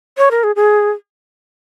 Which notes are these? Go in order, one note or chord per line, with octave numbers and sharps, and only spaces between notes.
C#5
A#4
G#4
G#4